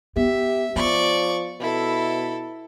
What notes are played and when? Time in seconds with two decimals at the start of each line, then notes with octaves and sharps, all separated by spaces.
0.16 B3 G4 E5
0.76 F3 B3 D5 C#6
1.61 B2 E4 A4